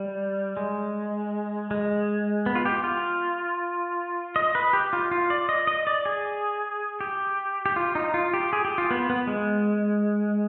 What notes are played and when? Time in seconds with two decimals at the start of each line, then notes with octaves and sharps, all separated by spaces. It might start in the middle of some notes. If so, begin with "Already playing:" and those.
Already playing: G3
0.57 G#3
1.71 G#3
2.46 B3
2.55 F4
2.65 G4
2.84 F4
4.36 D#5
4.55 B4
4.73 G4
4.93 F4
5.11 F4
5.30 D5
5.49 D#5
5.67 D#5
5.87 D5
6.06 G#4
7.01 G4
7.66 G4
7.76 F4
7.95 D#4
8.14 F4
8.34 G4
8.53 G#4
8.65 G4
8.78 F4
8.91 B3
9.10 B3
9.27 G#3